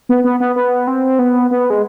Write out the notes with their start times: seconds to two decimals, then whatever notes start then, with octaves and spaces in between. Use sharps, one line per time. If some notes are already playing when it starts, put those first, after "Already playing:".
0.09 B3
0.24 B3
0.40 B3
0.56 B3
0.87 C4
1.19 B3
1.51 B3
1.70 G#3